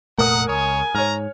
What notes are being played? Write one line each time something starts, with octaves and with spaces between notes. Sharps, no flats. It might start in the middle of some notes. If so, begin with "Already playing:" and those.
F1 A#2 A3 A#4 F#5 D#6
C#2 C#5 G#5
G#2 C#5 A#5 F6